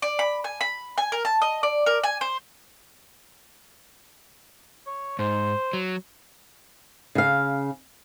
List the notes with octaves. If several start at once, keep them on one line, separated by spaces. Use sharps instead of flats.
D5
B5
G#5
B5
G#5
A#4
A5
D#5
D5
A#4
G#5
C5
C#5
G#2 C5
F#3
C#3 F5